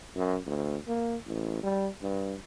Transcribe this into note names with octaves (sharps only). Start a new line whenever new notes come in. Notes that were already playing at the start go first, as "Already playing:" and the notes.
F#2
D2
A#3
A1
G3
G2